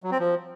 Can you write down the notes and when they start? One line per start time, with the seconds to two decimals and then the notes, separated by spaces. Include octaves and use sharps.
0.03 F#3
0.11 C4
0.19 F3